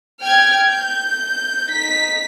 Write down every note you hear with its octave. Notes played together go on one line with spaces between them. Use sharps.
G5 F6 G#6
G6
D#4 B6